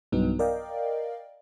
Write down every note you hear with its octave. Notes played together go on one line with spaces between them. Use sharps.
B1 G2 F#3 B3 D#4
A#4 D5 D#5 F5 G5